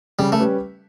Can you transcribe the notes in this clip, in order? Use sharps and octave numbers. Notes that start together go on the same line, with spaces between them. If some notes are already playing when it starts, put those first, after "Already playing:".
C#3 G3
A3
G3 C#4 G4 B4